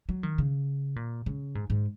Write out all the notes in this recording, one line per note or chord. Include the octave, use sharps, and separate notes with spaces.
F#3
D#3
C#3
A#2
C#3
G#2
G#2